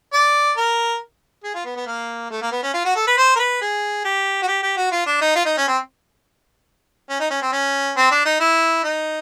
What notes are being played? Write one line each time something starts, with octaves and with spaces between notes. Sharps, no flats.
D5
A#4
G#4
F4
B3
B3
A#3
A3
A#3
B3
C#4
F4
F#4
A4
B4
C5
A#4
B4
G#4
G4
F#4
G4
G4
F#4
F4
D4
D#4
F4
D#4
C#4
C4
C#4
D#4
C#4
C4
C#4
C4
D4
D#4
E4
D#4